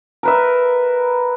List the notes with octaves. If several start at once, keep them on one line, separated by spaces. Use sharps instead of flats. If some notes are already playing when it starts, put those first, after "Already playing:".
A#4 B4 E5